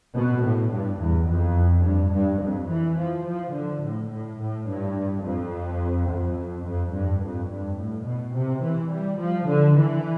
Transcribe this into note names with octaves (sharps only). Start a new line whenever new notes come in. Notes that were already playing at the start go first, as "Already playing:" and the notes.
B2
A2
G2
E2
F2
G2
G2
F2
E3
F3
F3
D3
A2
A2
A2
G2
F2
F2
F2
G2
F2
G2
A2
B2
C3
E3
G3
F3
D3
E3